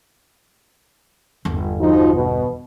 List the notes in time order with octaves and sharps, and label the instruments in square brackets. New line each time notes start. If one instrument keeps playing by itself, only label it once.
[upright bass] G1 E2
[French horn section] F3 D#4 F#4
B2